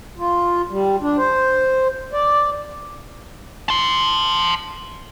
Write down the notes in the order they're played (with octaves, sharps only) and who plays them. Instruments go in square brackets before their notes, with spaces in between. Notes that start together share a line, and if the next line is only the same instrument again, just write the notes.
[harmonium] F4
G3
D4
C5
D5
[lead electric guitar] A5 C6